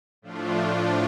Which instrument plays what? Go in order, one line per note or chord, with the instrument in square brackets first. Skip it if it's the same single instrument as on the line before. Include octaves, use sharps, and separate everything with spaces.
[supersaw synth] A2 F3 A3 D4 F4